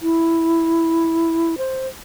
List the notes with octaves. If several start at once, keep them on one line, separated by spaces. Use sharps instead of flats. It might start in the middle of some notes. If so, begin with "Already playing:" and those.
E4
C5